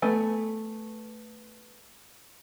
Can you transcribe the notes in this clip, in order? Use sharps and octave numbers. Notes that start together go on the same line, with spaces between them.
A3 B3 G#5